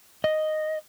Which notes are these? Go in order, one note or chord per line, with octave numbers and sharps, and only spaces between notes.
D#5